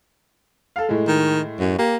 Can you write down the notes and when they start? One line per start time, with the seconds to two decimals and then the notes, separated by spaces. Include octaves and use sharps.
0.76 A4 F5
0.89 A2 G#3
1.07 D#3
1.59 F#2
1.79 A#3 G4